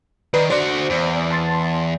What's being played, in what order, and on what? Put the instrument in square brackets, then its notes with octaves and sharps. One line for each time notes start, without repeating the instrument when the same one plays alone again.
[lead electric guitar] D#3 [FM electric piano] B4 D5 A#5
[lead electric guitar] D3 F#4 [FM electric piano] C5 D5
[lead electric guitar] E2
[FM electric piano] A5 C6 A6